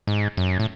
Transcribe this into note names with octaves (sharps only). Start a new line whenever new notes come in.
G#2
F#2
A2